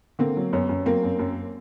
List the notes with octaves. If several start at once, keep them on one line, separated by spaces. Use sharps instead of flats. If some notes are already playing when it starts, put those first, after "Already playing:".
D3 A#3 C4
F#3
F#2 B3 C#4
F#2
F#3 A#3 C4
F#2
F#2